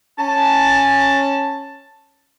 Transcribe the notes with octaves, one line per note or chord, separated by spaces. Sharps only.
C#4 A5